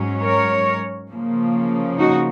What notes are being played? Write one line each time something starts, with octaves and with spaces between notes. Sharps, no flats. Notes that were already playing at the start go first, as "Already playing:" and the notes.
Already playing: G#2 F#3 C#4
A#4 C#5
C#3 F3 A#3
D#4 F#4